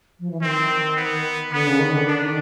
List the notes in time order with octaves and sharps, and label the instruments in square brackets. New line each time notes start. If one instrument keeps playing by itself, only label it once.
[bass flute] F3
E3
[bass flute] D#3 [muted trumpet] C4
[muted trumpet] B3
[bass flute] D3 [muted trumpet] B3
[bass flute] C#3
D#3
D3
[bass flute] D3 [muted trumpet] D4
[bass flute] D#3